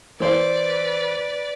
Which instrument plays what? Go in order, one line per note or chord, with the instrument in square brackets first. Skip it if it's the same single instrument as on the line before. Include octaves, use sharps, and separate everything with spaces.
[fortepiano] E3 C5 [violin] B4 D5